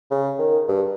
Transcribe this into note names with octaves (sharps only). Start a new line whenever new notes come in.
C#3
D#3
G2